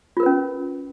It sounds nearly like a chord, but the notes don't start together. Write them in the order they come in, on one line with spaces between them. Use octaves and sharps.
F4 A#4 B4 C#4